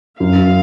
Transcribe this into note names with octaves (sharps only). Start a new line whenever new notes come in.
F#2 F5